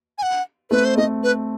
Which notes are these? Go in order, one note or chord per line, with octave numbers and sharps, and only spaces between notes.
G#5
F#5
A3 C4 B4
C5
A3 C4 D#5
B4